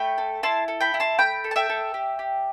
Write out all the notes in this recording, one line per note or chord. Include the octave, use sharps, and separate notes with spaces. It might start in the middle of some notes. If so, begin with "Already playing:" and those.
Already playing: A3 G5 B5
A4
E4 A5 C6
A4
G5 B5
E4
A5 C6
A3 G5 B5
A4
A5
E5 G5
A4
G4
G4